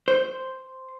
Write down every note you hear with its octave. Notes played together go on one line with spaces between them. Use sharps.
C5